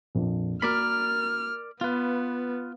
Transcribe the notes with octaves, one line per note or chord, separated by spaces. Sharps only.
A#1 F2
A#3 F#4 A#4 D5 B5 F6
B3 F4 B4 F5